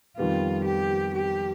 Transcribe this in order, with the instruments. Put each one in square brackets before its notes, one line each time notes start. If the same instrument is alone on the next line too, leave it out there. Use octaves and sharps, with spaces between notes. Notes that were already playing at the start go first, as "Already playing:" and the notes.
[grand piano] F2 D#3 G3 B3 [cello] F4
[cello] G4
G4